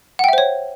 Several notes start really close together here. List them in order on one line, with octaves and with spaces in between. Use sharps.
F#5 G5 E5 C5 C#5